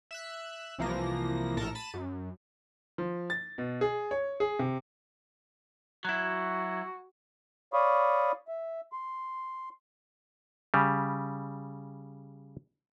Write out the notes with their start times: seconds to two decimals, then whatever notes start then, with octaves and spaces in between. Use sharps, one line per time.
0.11 E5 E6 F#6
0.79 C2 E3 F3 A#3 A#6
1.57 A#1 A2 A4 A#4 A5 A#6
1.75 A5 B5 A6 D#7
1.94 F#2
2.98 F3
3.30 A6
3.58 B2
3.81 G#4
4.11 C#5
4.40 G#4
4.59 C3
6.05 F#3 E4 F#4
7.73 C#5 D5 F5 B5 C#6 D#6
8.48 E5
8.92 C6
10.74 C#3 G3